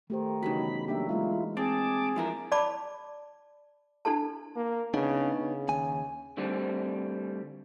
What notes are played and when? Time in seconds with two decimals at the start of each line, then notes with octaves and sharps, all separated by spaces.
0.10 D#3 A3 G4 C5
0.43 E2 G2 C#3 D#4 F#4 B5
0.88 F#3 A#3 D4 G4 E5
1.09 E3 G#3 A#3 E4 F4
1.57 C4 G#4 A5 D6
2.16 F3 E4 A#4
2.52 D5 A5 B5 D6
4.05 D4 E4 A4 A5
4.56 A#3
4.94 C#3 B3 D4 D#4
5.40 C#3
5.69 D#2 G#5
6.37 D2 D3 G3 C4